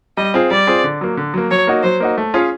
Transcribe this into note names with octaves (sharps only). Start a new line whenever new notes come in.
G3 D#5
C4 F4 G#4
G3 D5
C4 F4 G#4
D3
F#3 A#3
D3
F#3 A#3
F#3 C#5
A#3 D#4 F#4
F#3 C5
A#3 D#4 F#4
A3
C#4 F4 G#4 C#5